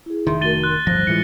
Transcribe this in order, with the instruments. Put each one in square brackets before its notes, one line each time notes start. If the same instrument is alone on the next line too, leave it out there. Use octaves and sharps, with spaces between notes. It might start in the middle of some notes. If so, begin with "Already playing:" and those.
[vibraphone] E4 G#4
[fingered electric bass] F1 D#3 [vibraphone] E5 C6
[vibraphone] A3 F#4 A#4 [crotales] A6 D#7 G7
[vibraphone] C6 [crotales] F#6
[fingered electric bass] D1 G1 F3 [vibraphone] G3 C5 [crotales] A#6
[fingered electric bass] A2 E3 G#3 [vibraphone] E4 F4 [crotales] C#7